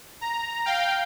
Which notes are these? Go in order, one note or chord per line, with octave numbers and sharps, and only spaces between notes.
A#5
F5 G5